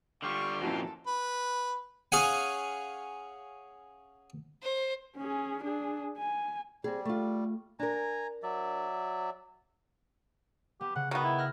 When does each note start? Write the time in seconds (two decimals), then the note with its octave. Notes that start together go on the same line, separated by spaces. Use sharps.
0.22 D3 G3 F4 F5 G5 C#6
0.62 F2 A#2 C#4 E4 F#4 A4
1.07 B4
2.12 C#4 G#4 F5 F#5 G#5
4.63 C5
5.17 C#4 G#4
5.63 D4 G#4
6.18 G#5
6.84 G3 C4 G#4
7.05 A3 F4
7.79 D4 A#4 G#5 A#5
8.43 F#3 D5 E5
10.81 B3 G4
10.95 C#3 F#5
11.11 D#3 B3 F#4
11.24 E4
11.38 F6 F#6 A#6